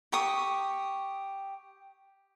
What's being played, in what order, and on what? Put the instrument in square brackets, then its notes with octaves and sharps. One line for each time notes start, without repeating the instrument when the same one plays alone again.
[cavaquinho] G4 C#6 D#6